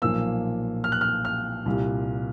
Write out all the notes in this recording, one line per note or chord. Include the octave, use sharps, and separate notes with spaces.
B1 A#2 F3 A#3 E6
F6
F#6
F6
F6
C2 A#2 G3